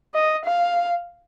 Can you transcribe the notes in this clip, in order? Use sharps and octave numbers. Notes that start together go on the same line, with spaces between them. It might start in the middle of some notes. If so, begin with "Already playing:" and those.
D#5
F5